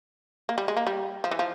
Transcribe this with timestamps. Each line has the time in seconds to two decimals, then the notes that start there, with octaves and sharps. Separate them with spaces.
0.49 A#3
0.58 G3
0.68 G#3
0.77 A#3
0.87 G3
1.24 F3
1.31 E3
1.39 F3